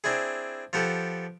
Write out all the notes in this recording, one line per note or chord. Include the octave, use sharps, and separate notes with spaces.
C4 D4 E4 G#4
F3 B3 G4 A4